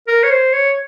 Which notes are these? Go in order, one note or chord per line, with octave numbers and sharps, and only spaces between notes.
A#4
C#5
C5
C#5